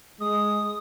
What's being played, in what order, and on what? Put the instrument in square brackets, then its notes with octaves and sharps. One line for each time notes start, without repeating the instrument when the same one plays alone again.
[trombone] G#3 [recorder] D#6